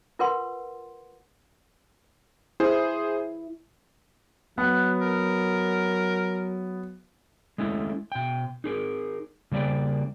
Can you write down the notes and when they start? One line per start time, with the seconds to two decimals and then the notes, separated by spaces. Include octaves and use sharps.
0.19 F4 A#4 B4 F#5 C6
2.60 E4 G#4 C5
4.58 F#3 B3 F#5
5.01 A#4
7.58 G#3 A3 C#4 E4
8.12 B2 G5
8.64 D#4 G#4 A#4
9.51 C#3 G3 A#3 D5 G5